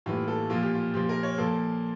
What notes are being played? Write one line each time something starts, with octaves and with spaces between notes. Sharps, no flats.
A2 E3 G3 A#3 F4
A4
A#2 F3 A#3 F4
G4
F4
A#2 F3 A#3 G4
A#4
C#5
A#2 F3 A#3 A4